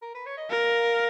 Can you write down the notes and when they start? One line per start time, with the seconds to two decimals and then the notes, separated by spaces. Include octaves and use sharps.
0.02 A#4
0.14 B4
0.26 C#5
0.37 D#5
0.50 A#4 F5